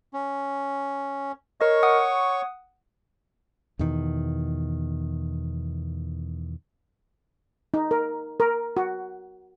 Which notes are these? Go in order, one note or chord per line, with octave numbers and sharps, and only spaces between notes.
C#4
A#4 C#5 D#5 C#6
F#5 D#6
E2 B2 D#3
D#4
A#4
A#4
F#4